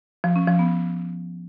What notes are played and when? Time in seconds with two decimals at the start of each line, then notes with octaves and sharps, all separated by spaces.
0.24 F3
0.36 C#4
0.47 F3
0.59 B3